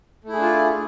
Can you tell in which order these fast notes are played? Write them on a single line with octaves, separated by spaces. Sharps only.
A3 E4 G#4 D4 F4